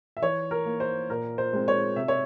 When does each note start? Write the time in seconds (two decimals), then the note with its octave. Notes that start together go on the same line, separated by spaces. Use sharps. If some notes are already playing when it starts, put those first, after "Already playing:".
0.17 E5
0.22 E3 C#5
0.51 A#4
0.66 A#3
0.80 C5
1.10 A#2 A#4
1.38 C5
1.53 G#3 C4
1.68 C#5
1.96 C3 E5
2.08 C#5